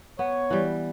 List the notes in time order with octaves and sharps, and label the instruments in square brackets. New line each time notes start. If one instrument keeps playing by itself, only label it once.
[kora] B3 [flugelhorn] C#5
[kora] E3 G3